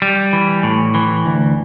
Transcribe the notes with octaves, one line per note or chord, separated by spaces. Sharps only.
G3
E3
A2
E3
D2